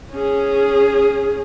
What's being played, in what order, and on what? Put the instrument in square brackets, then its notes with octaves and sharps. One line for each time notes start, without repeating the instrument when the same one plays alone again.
[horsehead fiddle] C#4 G#4